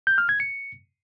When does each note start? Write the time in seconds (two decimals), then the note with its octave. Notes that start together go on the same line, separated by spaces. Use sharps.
0.07 G6
0.18 F6
0.29 G#6
0.40 C#7